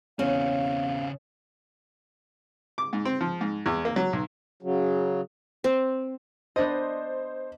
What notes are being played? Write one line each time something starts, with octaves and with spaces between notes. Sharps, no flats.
E2 C#3 C4 C#4 F5
D6
G#2
C4
F3
G#2
E2
A#3
F#3
B1
C#3 F#3
C4
B3 D4 C5 D#5